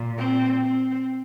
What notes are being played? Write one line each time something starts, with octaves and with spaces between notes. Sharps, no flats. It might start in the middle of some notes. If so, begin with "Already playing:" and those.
Already playing: A#2
C4
C4